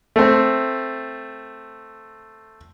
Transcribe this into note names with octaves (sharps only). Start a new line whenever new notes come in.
A3 C4